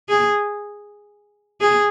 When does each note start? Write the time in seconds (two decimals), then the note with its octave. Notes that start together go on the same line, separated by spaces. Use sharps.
0.09 G#4
1.61 G#4